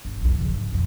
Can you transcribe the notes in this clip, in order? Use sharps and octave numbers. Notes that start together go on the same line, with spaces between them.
G1
B1 E2
C#3 F3
G#2
F2 A#2